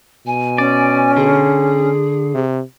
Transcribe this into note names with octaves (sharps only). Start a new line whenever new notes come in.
B2 G#5
C#4 D5
D3 G#4
C3